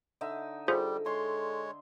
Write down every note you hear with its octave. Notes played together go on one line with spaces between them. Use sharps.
D3 D#4 E5
G3 F4 G#4 A4 C5
G#3 C#5 C6